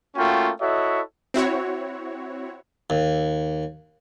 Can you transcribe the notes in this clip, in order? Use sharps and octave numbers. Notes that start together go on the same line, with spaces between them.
A3 A#3 C#4 F4 F#4 G5
E4 F#4 A4 C#5 D#5 E5
C4 E4 F#4 C#5
D#2